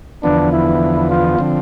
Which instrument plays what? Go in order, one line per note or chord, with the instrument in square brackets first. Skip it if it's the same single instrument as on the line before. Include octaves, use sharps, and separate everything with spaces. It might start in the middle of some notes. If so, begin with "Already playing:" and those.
[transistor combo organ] E2 D3 F3 B3 [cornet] D4
[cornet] E4
F4
[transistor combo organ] D3 F3 C4